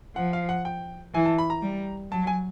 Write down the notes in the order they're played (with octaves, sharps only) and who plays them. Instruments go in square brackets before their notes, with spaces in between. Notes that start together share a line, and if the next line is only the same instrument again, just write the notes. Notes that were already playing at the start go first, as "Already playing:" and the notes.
[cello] F3 [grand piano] F#5
[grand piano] F5
F#5
G5
[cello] E3 [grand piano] G#5
[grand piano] A5
B5
A#5
[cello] G3
[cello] F#3 [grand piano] A5
[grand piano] G#5